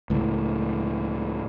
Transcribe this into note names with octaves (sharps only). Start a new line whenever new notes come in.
C#2 A2